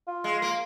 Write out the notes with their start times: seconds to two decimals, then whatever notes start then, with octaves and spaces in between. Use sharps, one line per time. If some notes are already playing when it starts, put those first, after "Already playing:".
0.07 F4
0.24 G#3
0.42 A#3